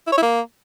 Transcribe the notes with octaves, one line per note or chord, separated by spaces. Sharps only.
E4
C#5
E4
A#3